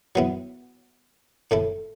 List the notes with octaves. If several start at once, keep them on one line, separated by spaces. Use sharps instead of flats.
F#3 B3 E4
A2 A3 E4